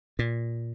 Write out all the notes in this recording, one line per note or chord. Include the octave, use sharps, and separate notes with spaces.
A#2